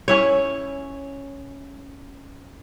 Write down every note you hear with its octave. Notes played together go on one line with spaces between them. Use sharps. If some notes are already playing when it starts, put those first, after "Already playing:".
C#4 E4 C#5